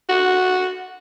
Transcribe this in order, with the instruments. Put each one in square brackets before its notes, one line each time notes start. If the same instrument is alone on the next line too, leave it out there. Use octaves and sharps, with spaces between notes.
[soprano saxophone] F#4